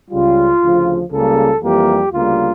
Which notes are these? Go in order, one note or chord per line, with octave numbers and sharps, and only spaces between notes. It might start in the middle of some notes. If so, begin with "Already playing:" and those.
C#2 C#3 G3 F4
D2 C#3 F3
C#2 C#3 G3 A#3 A4
F2 E3 G3 A#3 G4
D2 C#3 G3 A#3 F4